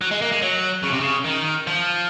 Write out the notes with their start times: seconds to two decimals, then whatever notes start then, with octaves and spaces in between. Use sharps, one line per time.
0.01 F#3
0.11 G#3
0.21 A#3
0.32 G#3
0.42 F#3
0.84 C#3
0.92 C3
1.01 C#3
1.26 D#3
1.67 F3